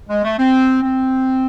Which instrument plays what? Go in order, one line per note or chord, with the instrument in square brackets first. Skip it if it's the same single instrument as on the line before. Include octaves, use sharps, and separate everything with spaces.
[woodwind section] G#3
A3
C4
C4